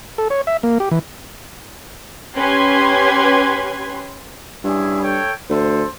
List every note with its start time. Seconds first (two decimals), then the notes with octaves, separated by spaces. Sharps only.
0.18 A4
0.30 C#5
0.47 E5
0.63 A#3
0.80 G4
0.91 E3
2.35 C#4 G4 B4 C6 G#6
4.64 G2 C#4 E4 G#4
5.02 A4 C#5 G5
5.50 D2 A4 C5